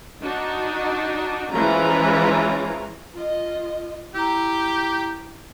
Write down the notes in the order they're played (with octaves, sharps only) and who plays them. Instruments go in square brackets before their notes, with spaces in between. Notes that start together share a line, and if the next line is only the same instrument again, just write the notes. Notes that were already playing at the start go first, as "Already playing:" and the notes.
[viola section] D4 D#4 F#4
E3 F3 G#3 C#4 F4 A#5
[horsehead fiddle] F4 D#5
[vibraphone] E4 A#5 [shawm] G4